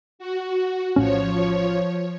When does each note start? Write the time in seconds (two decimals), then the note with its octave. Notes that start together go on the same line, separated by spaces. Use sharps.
0.19 F#4
0.96 A#1 A2 F3 C#4 C#5